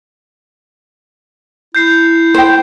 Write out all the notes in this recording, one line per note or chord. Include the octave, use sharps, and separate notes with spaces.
E4 G6 C7
C5 G5